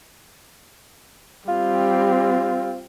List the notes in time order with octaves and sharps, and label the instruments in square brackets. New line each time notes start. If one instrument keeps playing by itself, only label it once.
[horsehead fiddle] G3 C4 [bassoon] F4